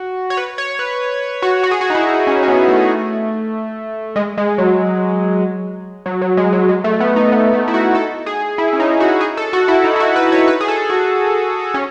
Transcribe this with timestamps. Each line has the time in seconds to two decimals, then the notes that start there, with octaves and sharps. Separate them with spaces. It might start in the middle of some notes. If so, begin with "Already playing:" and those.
Already playing: F#4
0.30 C#5
0.37 B4
0.58 C#5
0.79 B4
1.42 F#4
1.63 F#4
1.71 G#4
1.81 F#4
1.90 D#4
1.95 E4
2.27 C#4
2.43 C#4
2.48 B3
2.68 A3
4.16 G#3
4.38 G#3
4.58 F#3
6.06 F#3
6.21 F#3
6.37 G#3
6.53 F#3
6.69 G#3
6.84 A3
7.00 B3
7.16 D#4
7.32 B3
7.53 A3
7.68 E4
7.74 F#4
7.95 A4
8.26 G#4
8.58 E4
8.73 C#4
8.80 D#4
9.00 F#4
9.21 G#4
9.37 A4
9.53 F#4
9.68 E4
9.84 D#4
9.96 E4
10.00 F#4
10.16 B4
10.32 C#5
10.48 B4
10.60 G#4
10.68 A4
10.90 F#4
11.74 C#4